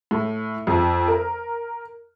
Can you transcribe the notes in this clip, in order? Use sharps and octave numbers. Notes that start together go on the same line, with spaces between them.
A2
F2
A#4